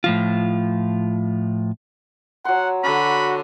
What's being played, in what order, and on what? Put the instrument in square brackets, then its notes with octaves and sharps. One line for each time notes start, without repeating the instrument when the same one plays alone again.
[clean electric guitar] A2 F3 F4
[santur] F#3 C6 [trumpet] F#5
[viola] D3 [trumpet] F#4 [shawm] B5